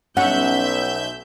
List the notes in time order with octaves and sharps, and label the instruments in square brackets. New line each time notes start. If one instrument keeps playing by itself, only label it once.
[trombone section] B1 [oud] C#4 [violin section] E5 G6 [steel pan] F#5